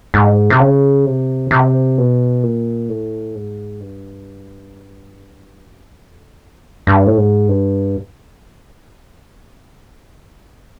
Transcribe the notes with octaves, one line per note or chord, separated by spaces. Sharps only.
G#2
C3
C#3
C3
C3
B2
A#2
A2
G#2
G2
F#2
F2
F#2
G2
A2
G#2
G2